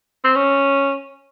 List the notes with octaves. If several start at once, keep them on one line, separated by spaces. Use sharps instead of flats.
C4
C#4